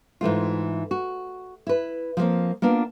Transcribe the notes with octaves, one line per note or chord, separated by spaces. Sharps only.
G#2 E3 A3 F4
F#4
E4 B4
F3 G3 A#3 C4
A#3 B3 D4 F4